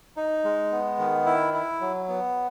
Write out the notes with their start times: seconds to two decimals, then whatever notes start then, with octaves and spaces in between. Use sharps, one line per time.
0.17 D#4
0.44 G#3
0.72 B3
0.99 D#3
1.26 E4
1.54 E4
1.81 F#3
2.09 B3